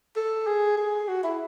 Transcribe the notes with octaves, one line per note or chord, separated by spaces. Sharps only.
A4
G#4
G#4
F#4
E4